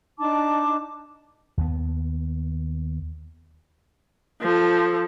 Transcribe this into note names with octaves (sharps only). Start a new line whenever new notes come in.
D4 D#4 A5 D6
D#2 B3
F3 A4